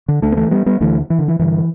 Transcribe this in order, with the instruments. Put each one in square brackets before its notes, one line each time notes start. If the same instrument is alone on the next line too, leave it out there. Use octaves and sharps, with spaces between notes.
[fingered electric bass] D3
D2 D3 A3 D4
B3
E3 A3
G3 B3
G3 B3
D2 D3 E3 A3
E3
D3
E3
G2 D3 E3